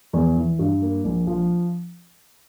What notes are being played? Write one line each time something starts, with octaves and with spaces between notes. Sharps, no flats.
E2
E3
G2
A#3
A#1
F3